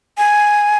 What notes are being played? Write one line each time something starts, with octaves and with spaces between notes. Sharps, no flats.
G#5